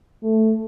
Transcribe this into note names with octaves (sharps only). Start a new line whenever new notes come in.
A3